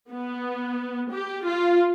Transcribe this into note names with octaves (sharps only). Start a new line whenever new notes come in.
B3
G4
F4